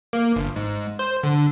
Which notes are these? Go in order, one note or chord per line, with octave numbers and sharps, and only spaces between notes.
A#3
G1
G#2
C5
D3